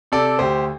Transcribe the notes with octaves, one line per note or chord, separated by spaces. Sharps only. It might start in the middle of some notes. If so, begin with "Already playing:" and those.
C3 A4 D5
D2 G4 C5